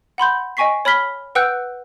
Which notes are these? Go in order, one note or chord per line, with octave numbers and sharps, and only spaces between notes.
F#5 B5 C6 G6
D#5 G5 G#5 C#6 B6 C7
C#5 B5 F6 B6 G7
B4 F#5 G5 E6 F#6 G6